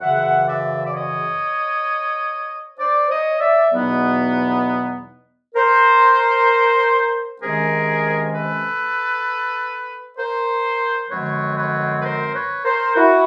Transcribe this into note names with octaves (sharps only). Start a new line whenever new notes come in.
F#2 C#3 E3 E5 F#5
D5 E5
D5
C#5 D#5
C5 D5
C#5 D#5
D5 E5
E2 B2 F#3 B3 D#4
A#4 C5
C3 D#3 G#3 C#4 G#4 A#4
A4 B4
A#4 C5
F#2 D3 F3 G#3 C4 B4 C#5
B4 C#5
B4
A#4 C5
B4 C#5
A#4 C5
E4 F#4